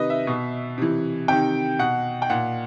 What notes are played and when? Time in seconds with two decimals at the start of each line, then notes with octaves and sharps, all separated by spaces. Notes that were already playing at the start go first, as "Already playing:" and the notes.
Already playing: C3 D#3 B4 D#5
0.10 E5
0.27 B2
0.78 C3 E3
1.28 C3 D#3 G5
1.79 B2 F#5
2.22 G5
2.30 A#2 F#5